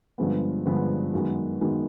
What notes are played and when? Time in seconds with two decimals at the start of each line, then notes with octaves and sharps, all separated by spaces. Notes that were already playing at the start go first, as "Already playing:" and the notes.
0.18 G2 D3 F3 G#3 B3
0.66 G2 D3 F3 G#3 B3
1.14 F#2 D#3 G#3 B3
1.61 F#2 D#3 G#3 B3